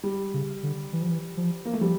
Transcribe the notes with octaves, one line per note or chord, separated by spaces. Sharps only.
G3
C#3
D3
E3
F3
E3
F3
A#3
A3
F3 G3